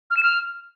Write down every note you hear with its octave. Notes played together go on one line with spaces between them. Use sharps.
F6
E7
F6